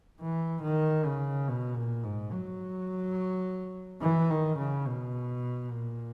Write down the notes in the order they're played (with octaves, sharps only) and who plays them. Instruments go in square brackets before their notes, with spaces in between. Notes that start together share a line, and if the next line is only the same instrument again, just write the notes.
[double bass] E3
D#3
C#3
B2
A#2
G#2
F#3
E3
D#3
C#3
B2
A#2